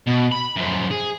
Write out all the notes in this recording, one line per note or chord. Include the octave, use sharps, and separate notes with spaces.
B2
B5
F#2 F3
G#4